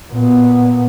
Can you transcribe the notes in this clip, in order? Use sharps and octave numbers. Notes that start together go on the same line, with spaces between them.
A#2 B3